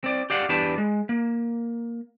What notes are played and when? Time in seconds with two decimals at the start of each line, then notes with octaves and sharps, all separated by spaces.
0.04 C4 D5
0.30 G4 D5 F5 F#5
0.49 E2 D4 G4 B4 D5 A5
0.78 G#3
1.09 A#3